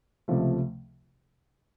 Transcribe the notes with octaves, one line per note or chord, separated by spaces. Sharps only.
C#2 C3 F3 A3